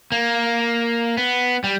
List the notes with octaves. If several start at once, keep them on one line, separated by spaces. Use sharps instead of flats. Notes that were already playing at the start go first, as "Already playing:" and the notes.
A#3
B3
G3